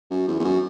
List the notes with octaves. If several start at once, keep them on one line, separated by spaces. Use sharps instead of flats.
F#2
E2
E2
F#2